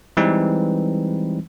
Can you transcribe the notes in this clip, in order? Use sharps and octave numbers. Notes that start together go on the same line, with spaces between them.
E3 G3 G#3 C4 D#4 B4